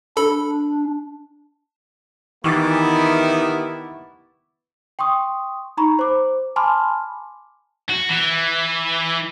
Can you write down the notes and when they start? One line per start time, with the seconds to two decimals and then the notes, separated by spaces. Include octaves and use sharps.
0.17 D4 A4 B5
2.44 D#3 E3 B3 E4 G4 C#6 D6 A6
4.99 G5 C6 C#6 D#6
5.77 D#4 A#5 B5 C#6
5.99 C5 D6
6.56 G#5 A5 B5 C6 D6 F6
7.90 F#4
8.09 E3